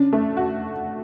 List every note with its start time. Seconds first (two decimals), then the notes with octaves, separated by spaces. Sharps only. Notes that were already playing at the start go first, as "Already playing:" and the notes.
Already playing: C#4 D4
0.13 A3
0.37 F#4